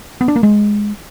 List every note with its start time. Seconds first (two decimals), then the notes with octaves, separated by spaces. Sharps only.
0.21 B3
0.28 D4
0.36 A#3
0.43 G#3